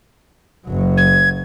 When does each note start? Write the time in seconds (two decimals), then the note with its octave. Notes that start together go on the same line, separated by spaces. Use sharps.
0.67 F#1 F#3
0.97 G#6